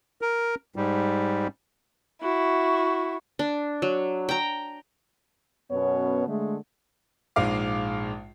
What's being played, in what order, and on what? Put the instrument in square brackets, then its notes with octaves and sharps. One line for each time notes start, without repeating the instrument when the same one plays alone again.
[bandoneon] A#4
G#2 G3
[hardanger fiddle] E4 [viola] F#4 C#6
[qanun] D4
F#3
G5 A#5
[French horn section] F#2 B2 B3 C#4 C#5
D3 G#3 A3
[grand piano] A#1 G#2 G#3 F5 D6